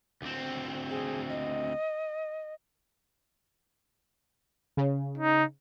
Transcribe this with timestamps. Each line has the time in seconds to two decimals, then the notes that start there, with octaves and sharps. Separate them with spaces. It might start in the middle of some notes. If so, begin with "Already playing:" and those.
0.22 D2 C4
0.90 G#4
1.29 D#5
4.77 C#3
5.18 D#4